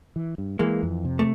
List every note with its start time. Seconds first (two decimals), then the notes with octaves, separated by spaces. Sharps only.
0.16 E3
0.38 G2
0.59 E3 G#3 A#3
0.83 F2
1.05 C3
1.19 A3